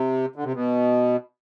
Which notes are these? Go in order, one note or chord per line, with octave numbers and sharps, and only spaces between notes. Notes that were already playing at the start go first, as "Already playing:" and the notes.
Already playing: C3
D3
C3
B2